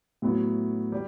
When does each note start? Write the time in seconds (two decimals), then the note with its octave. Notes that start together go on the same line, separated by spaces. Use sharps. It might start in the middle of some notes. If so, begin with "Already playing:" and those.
0.22 A2 F#3 B3 E4
0.92 G3